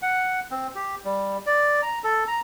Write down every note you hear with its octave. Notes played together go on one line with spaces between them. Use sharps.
F#5
C4
G4
G3
D5
A#5
A4
A#5